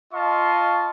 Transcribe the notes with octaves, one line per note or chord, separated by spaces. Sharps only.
F4 D#5 F5 A5 C6 C#6